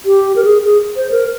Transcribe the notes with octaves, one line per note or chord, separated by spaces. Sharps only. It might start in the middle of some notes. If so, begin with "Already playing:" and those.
G4
A#4
G#4
G#4
C5
A#4